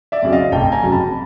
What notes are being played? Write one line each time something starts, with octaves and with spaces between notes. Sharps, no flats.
D5 E5
F2 C#3 F#3
D#5 F5
F1 G5 A5
G#5 A#5
F2 C#3 F#3
A5 B5